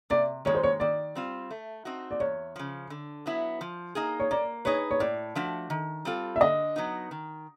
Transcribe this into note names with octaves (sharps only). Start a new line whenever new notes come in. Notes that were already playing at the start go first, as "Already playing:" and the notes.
C3 D5
D#3 G#3 C#5
C5
C#5
D#3 D5
G3 C4 F4
A3
C4 D#4 F#4
D5
E2 C#5
C#3 F3
D3
F#3 B3 E4
F3
A#3 D#4 G#4
C#5
A#3 D5
D#4 G#4 B4 C#5
C#5
A2 D5
F3 A3 D4 F#4
D#3
G3 C4 F4 A4
E5
D3 D#5
F#3 B3 D#4 F#4
D#3